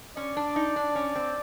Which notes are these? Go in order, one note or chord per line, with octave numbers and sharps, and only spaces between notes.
C#4 D5
D4
D#4
D4
C#4
C4